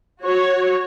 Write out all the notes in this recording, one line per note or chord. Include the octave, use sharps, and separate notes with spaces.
F#4 C#5